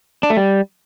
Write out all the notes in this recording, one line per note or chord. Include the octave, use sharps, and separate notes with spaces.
D4
A3
G3